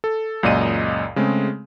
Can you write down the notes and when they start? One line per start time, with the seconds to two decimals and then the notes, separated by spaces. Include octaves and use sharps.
0.04 A4
0.43 C#2 F#2 A#2 D5 D#5 D#7
1.16 C#3 G#3 A3 C4